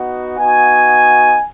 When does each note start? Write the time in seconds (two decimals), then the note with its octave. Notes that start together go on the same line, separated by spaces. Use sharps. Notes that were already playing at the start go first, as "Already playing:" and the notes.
Already playing: B3 D#4 F#4
0.38 B3 D#4 F#4 G#5